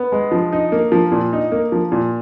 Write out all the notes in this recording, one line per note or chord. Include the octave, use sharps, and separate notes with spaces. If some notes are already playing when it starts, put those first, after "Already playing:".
Already playing: B3
G#3
F3
D#4
A#3
F3
A#2
D#4
A#3
F3
A#2